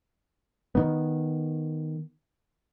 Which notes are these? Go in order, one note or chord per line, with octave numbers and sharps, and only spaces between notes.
D#3 B3